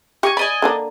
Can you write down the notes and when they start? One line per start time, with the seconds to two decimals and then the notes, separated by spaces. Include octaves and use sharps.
0.23 G4 D#5 G#5 C#6
0.37 D5 D#5 G#5 B5
0.62 D3 A#3 D4